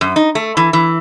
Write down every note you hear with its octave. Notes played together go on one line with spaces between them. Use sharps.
F#2
D#4
A3
E3
E3